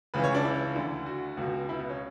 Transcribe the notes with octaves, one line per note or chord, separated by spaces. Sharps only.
C#2 C#3 E3 B4
C#5
D4
E4
D2 D3
F#4
C#2 B2
E4
B3
C#4